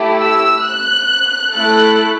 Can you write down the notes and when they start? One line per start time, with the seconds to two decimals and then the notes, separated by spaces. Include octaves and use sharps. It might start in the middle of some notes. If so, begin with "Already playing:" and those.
Already playing: A3 E4 G4
0.20 E6
0.65 F#6
1.53 A3 E4 A4 F#6